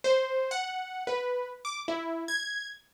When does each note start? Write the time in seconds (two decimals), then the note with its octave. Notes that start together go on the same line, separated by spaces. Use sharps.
0.04 C5
0.51 F#5
1.07 B4
1.65 D6
1.88 E4
2.28 G#6